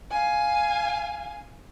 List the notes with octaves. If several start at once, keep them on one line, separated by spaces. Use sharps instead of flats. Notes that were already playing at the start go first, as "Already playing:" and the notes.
F5 G#5